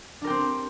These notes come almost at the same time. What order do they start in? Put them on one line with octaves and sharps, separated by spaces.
D4 A#4 G4 C4